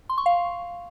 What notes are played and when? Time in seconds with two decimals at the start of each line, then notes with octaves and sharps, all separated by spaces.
0.10 C6
0.18 C#6
0.26 F5